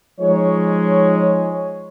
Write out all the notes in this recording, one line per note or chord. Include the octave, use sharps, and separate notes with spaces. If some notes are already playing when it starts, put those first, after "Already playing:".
F3 G#3 D#4 C#5